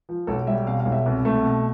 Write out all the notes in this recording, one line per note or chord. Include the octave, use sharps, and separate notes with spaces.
F3
B1 A4
G3 E5
B2 F5
F5
B1
E5
C2
A3
B2